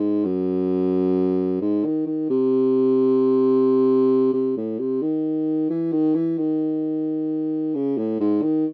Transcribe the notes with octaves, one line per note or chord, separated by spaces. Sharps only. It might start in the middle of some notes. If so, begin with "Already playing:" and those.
Already playing: G#2
F#2
G#2
D#3
D#3
C3
C3
A2
C3
D#3
E3
D#3
E3
D#3
C#3
A2
G#2
D#3